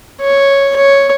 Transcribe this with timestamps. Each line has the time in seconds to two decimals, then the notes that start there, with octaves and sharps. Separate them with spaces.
0.21 C#5
0.76 C#5